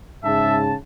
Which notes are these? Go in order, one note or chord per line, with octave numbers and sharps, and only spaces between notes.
G#2 C#3 E5 A5